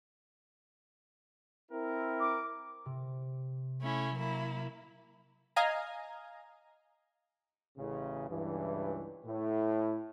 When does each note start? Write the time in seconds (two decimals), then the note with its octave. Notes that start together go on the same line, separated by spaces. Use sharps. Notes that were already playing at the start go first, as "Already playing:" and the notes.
1.71 C4 E4 A#4
2.20 D6
2.86 C3
3.82 A3 C#4 E4
4.15 F#3 A#3 E4
5.56 D#5 F5 G#5 A#5
7.77 A1 A2 C#3
8.29 C#2 G2 E3
9.25 A2